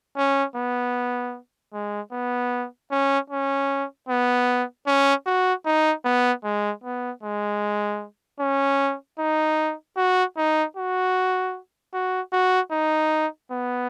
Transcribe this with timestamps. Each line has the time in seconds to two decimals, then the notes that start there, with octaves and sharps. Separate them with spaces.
0.17 C#4
0.56 B3
1.74 G#3
2.12 B3
2.91 C#4
3.30 C#4
4.09 B3
4.87 C#4
5.26 F#4
5.66 D#4
6.05 B3
6.44 G#3
6.84 B3
7.23 G#3
8.40 C#4
9.19 D#4
9.97 F#4
10.37 D#4
10.77 F#4
11.94 F#4
12.33 F#4
12.72 D#4
13.51 B3